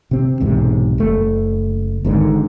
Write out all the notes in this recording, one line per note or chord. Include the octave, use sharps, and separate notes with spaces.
C3 C4
B1 E2 G#2 C3
F#1 A3
G#1 G#2 B2 D3